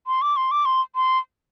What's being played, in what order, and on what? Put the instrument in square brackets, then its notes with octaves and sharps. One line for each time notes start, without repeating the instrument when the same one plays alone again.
[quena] C6
D6
C6
D6
C6
C6